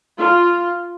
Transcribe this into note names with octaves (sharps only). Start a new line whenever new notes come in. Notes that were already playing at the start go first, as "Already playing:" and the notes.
F4